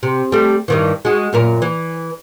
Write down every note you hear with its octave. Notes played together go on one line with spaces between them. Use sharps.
C3
G3 A3
G2 D#3 E3
G#3 F#4
F#2 A#2 A#4
E3